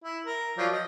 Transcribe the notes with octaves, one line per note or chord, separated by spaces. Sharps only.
E4
A#4
F3 F#3 D5
D#5